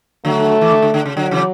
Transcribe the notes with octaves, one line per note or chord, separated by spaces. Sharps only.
D3 F#3 A3
E3
D3
D3
D3
C#3
D3 F#3
C#3 E3